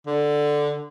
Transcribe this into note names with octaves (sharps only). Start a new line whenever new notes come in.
D3